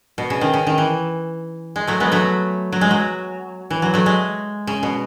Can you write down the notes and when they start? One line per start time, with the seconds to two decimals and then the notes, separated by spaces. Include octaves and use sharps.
0.18 B2
0.30 C#3
0.41 D#3
0.54 C#3
0.67 D#3
0.78 E3
1.76 G#3
1.87 F#3 A3
2.00 G#3 B3
2.12 F#3 A3
2.72 F#3
2.81 G#3
2.91 F#3
3.70 E3
3.82 F#3
3.94 F#3 A3
4.06 G#3
4.67 C#3
4.83 B2